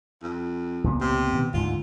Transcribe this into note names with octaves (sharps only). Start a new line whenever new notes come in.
F2
C#2 A#2 B3
C3
B2 D#3 B3
D2 G#2 D3 F4